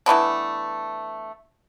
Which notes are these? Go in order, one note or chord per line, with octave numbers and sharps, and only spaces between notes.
E3 A3 B3 D4